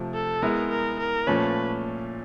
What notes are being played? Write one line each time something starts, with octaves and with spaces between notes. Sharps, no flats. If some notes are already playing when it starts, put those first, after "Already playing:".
Already playing: C3 F3 A3
A4
G#3 B3 E4 A#4
A#4
A#4
A#2 F3 A3 C#4 B4